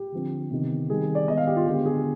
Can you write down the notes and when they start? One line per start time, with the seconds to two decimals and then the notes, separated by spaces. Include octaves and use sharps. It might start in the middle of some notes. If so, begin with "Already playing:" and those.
Already playing: G4
0.12 D3 F3 C4
0.51 C3 D#3 B3
0.89 D#3 G3 C4 G#4
1.15 D5
1.28 D#3 G#3 B3 D#5
1.37 F5
1.47 G4
1.56 F4
1.66 D3 G#3 B3 G4
1.86 G#4